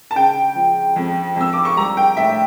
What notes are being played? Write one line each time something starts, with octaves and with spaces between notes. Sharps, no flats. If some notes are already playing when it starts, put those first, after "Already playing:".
A5
C#3 G5
F3
F2
F2 E6
D6
C#6
G3 A#5
G5
A2 E5